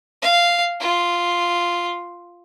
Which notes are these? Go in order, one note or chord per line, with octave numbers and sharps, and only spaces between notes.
F5
F4